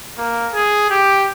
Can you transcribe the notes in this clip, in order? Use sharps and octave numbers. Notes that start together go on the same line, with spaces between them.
A#3
G#4
G4